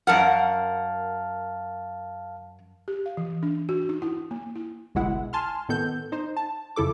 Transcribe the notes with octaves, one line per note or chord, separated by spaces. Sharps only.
F#2 A#4 F5 F#5 A5 F6
G4
F5
E3
D4
F#4
D#4
E4
A#3
E4
G1 C2 B2 G#3 E4 F#5
G#5 A5 C6 F6
A2 D#3 B3 A4 G6
D#4 C5
A5
F2 C#3 E4 A4 D6